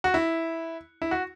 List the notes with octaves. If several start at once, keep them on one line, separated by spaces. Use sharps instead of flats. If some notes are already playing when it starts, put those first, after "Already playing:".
F#4
E4
E4
F#4